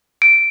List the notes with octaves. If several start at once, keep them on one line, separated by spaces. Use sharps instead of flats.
D7